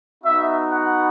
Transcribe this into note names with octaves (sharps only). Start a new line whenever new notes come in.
B3 D#4 F#4 E5
F#5